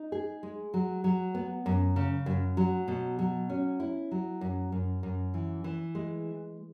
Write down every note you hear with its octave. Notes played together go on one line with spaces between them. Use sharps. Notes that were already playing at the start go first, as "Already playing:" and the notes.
Already playing: D#4
G#4
G#3
F#3
F#3
B3
F#2
C#3
F#2
F#3
B2
F#3
C#4
E4
F#3
F#2
F#2
F#2
E3
E3
G#3